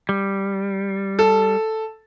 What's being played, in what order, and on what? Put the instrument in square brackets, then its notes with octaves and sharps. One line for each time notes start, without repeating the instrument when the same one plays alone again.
[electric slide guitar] G3
[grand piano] A4